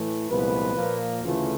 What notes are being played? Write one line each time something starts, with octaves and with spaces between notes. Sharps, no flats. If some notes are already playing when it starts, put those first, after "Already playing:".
Already playing: A2 E3 A3
C2 A#2 F3 G#3 B3 B4
A#2 F3 A#3
D2 C#3 E3 A3 F4